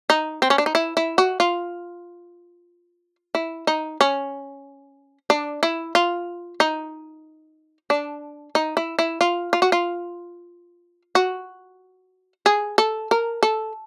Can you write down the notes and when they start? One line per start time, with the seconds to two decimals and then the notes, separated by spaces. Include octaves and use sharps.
0.10 D#4
0.42 C4
0.50 C#4
0.58 D4
0.66 D#4
0.75 E4
0.97 E4
1.18 F#4
1.40 F4
3.35 E4
3.67 D#4
4.01 C#4
5.30 D4
5.63 E4
5.95 F4
6.60 D#4
7.90 D4
8.55 D#4
8.77 E4
8.99 E4
9.21 F4
9.53 F4
9.62 F#4
9.72 F4
11.15 F#4
12.46 G#4
12.78 A4
13.11 A#4
13.43 A4